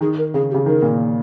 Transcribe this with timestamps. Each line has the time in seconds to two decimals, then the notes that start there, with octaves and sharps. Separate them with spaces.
0.01 D#3 G#4
0.18 A#4
0.34 C#3 G#4
0.50 G4
0.54 C#3
0.66 D#3 A#4
0.82 A#2